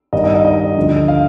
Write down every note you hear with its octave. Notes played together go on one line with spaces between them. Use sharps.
G2 D#3 D#5
D#5
D#5
D#5
D2 D3 F3
F5